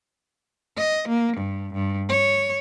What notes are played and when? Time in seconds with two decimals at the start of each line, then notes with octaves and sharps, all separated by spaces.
0.77 D#5
1.08 A#3
1.37 G2
1.74 G2
2.09 C#5